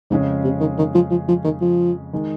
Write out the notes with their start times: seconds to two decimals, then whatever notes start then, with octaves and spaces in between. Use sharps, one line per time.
0.10 F2 G#2 C#3 G#3 C#4
0.44 C3
0.60 D#3
0.78 D#3
0.95 F3
1.11 F3
1.28 F3
1.44 D#3
1.61 F3
2.13 D#3 G#3